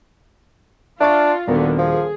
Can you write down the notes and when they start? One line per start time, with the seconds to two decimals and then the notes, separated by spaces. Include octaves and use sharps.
1.01 D4 F4 E5 C#6 A6
1.47 D#1 A#2 D3 D#3 B3 F#4 A#4
1.79 F3 G#4